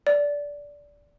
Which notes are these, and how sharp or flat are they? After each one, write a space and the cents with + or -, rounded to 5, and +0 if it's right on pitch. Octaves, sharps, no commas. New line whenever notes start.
D5 -15